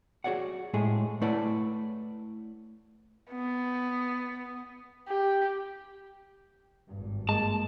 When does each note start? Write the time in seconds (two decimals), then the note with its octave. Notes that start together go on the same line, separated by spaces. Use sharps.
0.24 F#4 G#4 C#5 D5 F#5
0.74 A2 G#3 A3 G#4
1.21 A3 E4 B4 C#5 D5 F#5
3.31 B3
5.08 G4
6.89 G#1 G2
7.29 G#3 A#3 A5